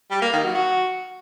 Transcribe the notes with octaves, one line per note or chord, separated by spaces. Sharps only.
G3
A#3
D#3
F#3
F#4